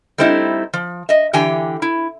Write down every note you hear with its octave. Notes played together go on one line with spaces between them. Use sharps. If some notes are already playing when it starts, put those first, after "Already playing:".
G3 A3 C4 D#4 E4
F3
D#5 E5
D3 E3 G4 G5 G#5
E4